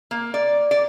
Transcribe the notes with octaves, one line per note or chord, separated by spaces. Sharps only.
A#3
D5
D5